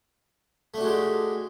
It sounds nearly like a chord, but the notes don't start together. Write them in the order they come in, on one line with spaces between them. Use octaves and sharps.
A3 D4 F#4 G#3 G4